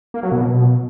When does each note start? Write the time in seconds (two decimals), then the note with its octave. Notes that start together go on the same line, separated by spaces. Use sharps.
0.14 A#3
0.23 F#3
0.32 B2